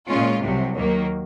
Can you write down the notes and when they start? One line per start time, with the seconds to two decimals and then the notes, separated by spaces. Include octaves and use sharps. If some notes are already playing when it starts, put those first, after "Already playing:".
0.08 A#2 G#3 C#4 F4
0.42 C2 C3 F#3
0.76 D#2 D#3 F#3 A#3